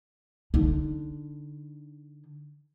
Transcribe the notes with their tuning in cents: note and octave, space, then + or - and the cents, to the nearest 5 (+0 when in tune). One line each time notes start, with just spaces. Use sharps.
D3 +0 D#4 +0